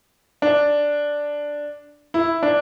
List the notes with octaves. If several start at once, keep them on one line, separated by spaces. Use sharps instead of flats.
D4
E4
D4